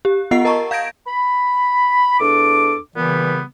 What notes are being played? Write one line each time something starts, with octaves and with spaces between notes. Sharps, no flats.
G4
B3 F4 D#5 F#5 C7
A#4 D#5 A5 A#5 C#6
F5 G6 G#6 A#6 D7
B5
E2 D4 A4 D6
A#2 C#3 E3 G3 B3